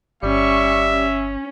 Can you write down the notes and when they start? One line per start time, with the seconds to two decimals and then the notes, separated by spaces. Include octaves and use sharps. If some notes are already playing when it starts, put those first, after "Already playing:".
0.23 G1 G3 C#4 E5 C#6
0.91 C#4